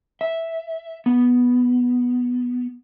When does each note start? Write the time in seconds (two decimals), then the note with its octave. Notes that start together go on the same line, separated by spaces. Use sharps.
0.21 E5
1.06 B3